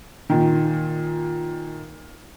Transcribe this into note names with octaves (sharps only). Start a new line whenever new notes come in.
A#2 D#3